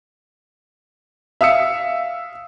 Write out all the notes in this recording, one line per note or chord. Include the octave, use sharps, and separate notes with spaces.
E5 F5 D#6 E6 C#7